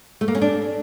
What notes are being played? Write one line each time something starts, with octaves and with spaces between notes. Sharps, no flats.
A3
A#3
C#4
D4